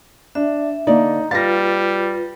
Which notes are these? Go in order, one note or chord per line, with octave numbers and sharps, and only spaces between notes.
D4 E5
D3 A#3 D#4 D5
G3 F4 B4 F5 A6 A#6